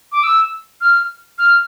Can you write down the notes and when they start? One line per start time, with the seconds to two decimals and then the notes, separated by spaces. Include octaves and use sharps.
0.12 D6
0.23 E6
0.81 F6
1.38 F6